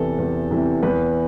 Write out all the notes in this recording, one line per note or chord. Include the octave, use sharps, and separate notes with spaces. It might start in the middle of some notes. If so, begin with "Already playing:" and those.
Already playing: E2 C3 E3 A4
E2
C3 E3
E2 B4